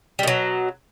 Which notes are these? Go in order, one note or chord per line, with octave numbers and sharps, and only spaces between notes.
B2 F#3 G3